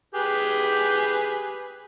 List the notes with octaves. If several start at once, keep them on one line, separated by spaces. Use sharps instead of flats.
G4 G#4 B4